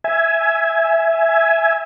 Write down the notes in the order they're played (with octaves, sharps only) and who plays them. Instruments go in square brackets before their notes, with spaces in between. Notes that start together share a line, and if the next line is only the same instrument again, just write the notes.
[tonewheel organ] E5 G#5